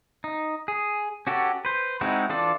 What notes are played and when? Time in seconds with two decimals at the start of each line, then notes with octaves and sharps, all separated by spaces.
0.24 D#4
0.68 G#4
1.27 C#4 F#4 G4 A4
1.65 B4 C5
2.01 G#3 C4 D#4 E4 F#4
2.30 E3 D4 F4 A4 D5